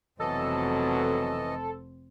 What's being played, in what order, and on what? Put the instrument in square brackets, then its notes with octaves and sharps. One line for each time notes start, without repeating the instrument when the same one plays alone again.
[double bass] F1 C4 [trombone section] B2 F#3 [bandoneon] E3 D#5 [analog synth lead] A4